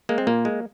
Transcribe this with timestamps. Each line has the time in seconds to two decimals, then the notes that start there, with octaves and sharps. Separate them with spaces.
0.09 G#3 A#3
0.18 C4
0.27 A#2 A#3
0.45 G#3